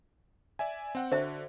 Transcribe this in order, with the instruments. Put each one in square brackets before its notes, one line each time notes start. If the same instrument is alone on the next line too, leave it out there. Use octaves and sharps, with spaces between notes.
[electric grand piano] D5 E5 G#5
C4 F#5 G5
[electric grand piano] D3 F#4 [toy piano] C5 E5